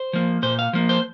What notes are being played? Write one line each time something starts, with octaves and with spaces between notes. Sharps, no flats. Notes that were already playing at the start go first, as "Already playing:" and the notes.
Already playing: C5
F3 A#3
A#2 C5
F5
F3 A#3
C5